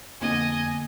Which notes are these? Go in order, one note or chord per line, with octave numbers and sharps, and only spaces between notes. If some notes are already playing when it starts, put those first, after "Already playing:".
F2 D3 A#3 B3 D#5 G#5